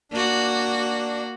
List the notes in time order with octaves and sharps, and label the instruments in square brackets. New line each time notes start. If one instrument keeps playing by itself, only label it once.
[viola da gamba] A#3 F#4 [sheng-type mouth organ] D4